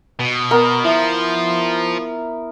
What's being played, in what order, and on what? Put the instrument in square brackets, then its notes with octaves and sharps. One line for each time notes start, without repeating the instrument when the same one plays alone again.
[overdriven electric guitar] B2
[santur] B3 A#4
[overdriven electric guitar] F3 [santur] E4